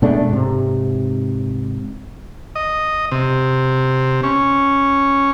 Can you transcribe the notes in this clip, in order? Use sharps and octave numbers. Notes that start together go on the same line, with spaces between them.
B2 G#3 A3 D4
G#2 C3
D#5
C3
C#4